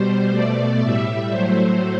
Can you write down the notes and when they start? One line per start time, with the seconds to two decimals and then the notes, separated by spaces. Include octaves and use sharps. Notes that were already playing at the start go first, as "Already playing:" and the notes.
Already playing: B2 G3 C5
0.30 B2 A3 D5
0.80 A2 G3 E5
1.31 A2 F#3 A3 C5